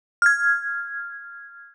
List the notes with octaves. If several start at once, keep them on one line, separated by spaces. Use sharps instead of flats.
F6 G#6